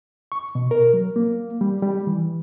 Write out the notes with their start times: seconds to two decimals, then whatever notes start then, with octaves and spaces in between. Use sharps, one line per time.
0.32 C#6
0.55 B2
0.71 A#4
0.94 F#3
1.16 A#3
1.61 G3
1.82 G3
2.07 E3